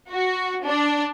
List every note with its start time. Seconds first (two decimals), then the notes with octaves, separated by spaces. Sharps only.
0.11 F#4
0.66 D4